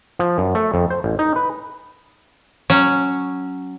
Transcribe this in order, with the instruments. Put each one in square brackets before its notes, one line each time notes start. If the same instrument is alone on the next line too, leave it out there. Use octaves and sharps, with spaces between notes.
[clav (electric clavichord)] F3
F#2
A3
F2
C5
A1
D#4
B4
[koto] F#3 C#4